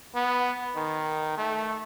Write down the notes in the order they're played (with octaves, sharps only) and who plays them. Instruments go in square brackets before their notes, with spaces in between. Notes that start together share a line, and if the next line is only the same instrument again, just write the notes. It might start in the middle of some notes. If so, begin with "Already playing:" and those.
[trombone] B3
D#3
A3